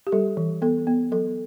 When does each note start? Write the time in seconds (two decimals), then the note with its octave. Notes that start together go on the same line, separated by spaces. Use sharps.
0.07 G4
0.12 G3 A4
0.37 E3
0.62 B3 A4
0.87 B3
1.12 F#3 A4